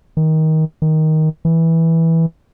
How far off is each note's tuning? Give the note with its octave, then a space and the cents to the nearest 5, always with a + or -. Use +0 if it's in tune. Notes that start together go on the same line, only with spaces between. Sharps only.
D#3 +20
D#3 +10
E3 -10